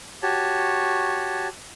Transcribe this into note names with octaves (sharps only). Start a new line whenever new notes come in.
F#4 G4 C#5 A5